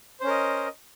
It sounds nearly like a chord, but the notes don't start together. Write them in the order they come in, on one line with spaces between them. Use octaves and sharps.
C5 C#4 A#4 D#5